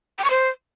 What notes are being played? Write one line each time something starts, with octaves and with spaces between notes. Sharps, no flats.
G5
C#6
C5